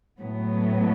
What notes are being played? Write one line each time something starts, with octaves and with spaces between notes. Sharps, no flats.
A2 F#3 B3